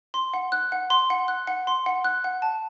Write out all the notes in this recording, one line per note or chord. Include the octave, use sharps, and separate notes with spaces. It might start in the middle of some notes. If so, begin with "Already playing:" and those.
C6
F#5
F#6
F#5
C6
F#5
F#6
F#5
C6
F#5
F#6
F#5
A5